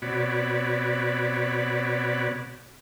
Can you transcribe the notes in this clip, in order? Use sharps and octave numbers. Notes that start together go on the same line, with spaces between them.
B2 C4 F#4 C#5 D5 B5